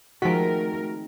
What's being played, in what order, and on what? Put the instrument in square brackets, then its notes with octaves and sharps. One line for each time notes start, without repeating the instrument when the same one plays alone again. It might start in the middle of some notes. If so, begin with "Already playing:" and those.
[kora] D#3 G#3 C4 [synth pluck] F3 B6 [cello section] A3 A#4 [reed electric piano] F#4